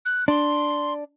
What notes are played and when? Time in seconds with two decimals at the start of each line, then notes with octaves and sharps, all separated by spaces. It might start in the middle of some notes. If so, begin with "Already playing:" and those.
0.06 F#6
0.28 D4 C6